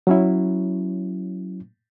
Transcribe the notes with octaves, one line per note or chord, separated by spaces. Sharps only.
F#3 C#4 E4